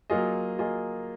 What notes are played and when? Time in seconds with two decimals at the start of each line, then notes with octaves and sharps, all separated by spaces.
0.10 F#3 A#3 F4 G#4 D#5
0.59 F#3 A#3 F4 G#4 D#5